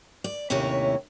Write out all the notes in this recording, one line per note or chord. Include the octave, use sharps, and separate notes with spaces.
D5
D#2 A2 C3 C#4 E4 C#5